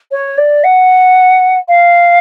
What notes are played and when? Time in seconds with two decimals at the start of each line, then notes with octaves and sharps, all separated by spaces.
0.11 C#5
0.38 D5
0.64 F#5
1.68 F5